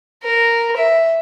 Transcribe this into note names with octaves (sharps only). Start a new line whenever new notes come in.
A#4
E5